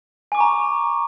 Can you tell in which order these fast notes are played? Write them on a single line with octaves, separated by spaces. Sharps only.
G#5 D6 C#6 A#5